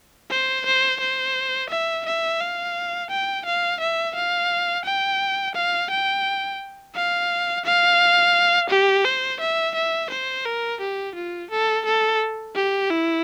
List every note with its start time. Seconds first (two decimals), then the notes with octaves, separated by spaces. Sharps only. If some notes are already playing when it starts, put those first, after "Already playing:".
0.30 C5
0.66 C5
1.01 C5
1.70 E5
2.06 E5
2.41 F5
3.11 G5
3.46 F5
3.80 E5
4.15 F5
4.86 G5
5.56 F5
5.90 G5
6.95 F5
7.65 F5
8.70 G4
9.05 C5
9.40 E5
9.75 E5
10.11 C5
10.46 A#4
10.81 G4
11.15 F4
11.51 A4
11.86 A4
12.55 G4
12.90 E4